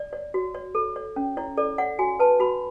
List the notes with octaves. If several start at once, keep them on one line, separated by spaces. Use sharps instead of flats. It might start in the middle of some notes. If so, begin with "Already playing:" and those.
Already playing: D5
C#5
F#4
C#5
A4
C#5
C#4
E4 C#5
A4 D5
C#5 F#5
F#4 G#5
B4 A5
F#4 B5